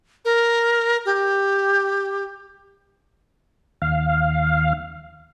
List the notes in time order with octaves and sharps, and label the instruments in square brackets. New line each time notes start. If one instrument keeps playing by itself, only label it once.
[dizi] A#4
G4
[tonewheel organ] D#2 F5